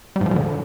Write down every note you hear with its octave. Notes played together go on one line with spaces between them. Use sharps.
G3
G#2
F3
A#2
D3